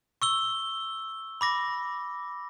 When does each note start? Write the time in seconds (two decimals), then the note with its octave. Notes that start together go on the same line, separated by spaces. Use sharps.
0.22 C#6 E6 G7
1.41 B5 D6 A#6